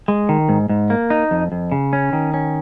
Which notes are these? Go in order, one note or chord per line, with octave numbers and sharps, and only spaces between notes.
G#3
D#3
G#2
G#2
A#3
D#4
F2
F2
C#3
C#4
D#3
C#4